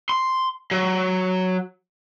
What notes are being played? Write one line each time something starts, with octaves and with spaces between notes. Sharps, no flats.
C6
F#3